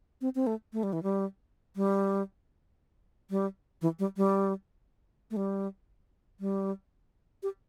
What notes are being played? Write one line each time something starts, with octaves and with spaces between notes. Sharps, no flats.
C4
C4
A3
A3
G3
E3
G3
G3
G3
E3
G3
G3
A3
G3
G3
G4